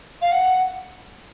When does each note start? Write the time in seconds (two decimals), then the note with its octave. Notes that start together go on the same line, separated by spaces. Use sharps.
0.21 F5
0.32 F#5